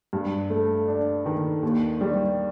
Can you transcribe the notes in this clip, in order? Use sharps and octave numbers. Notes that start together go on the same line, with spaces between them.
G2
A3
D4
D#3
D#2
G3